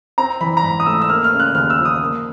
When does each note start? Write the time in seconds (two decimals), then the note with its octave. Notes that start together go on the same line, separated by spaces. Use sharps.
0.18 C4 A#5
0.41 E3 B5
0.57 A#5
0.63 G#2 B5
0.80 D#6
0.86 A3 E6
1.02 E6
1.09 A#3 F6
1.24 F6
1.32 C#3
1.40 F#6
1.55 D#2 F6
1.70 E6
1.78 F3
1.85 D#6
2.01 A#3